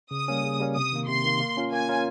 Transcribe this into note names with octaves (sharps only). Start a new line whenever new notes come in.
C#3 D#6
G3 A#3 C#4
C#3
G3 A#3 C#4
C3 D#6
D#3 A#3
C3 C6
D#3 A#3
A#3
C#4 F4 A#4
A#3 G#5
C#4 F4 A#4